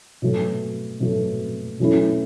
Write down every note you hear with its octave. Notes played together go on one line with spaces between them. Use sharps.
B2 F#3 A3
B2 F#3 A3
B2 F#3 A3 C#4 E4